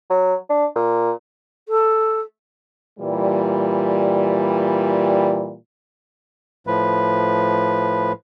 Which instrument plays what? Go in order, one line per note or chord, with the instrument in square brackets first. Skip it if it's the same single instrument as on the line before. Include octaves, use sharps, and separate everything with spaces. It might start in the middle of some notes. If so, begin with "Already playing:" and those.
[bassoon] F#3
D4
A#2
[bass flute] A4
[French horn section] A#2 E3 G3
[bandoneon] A2 F3 B4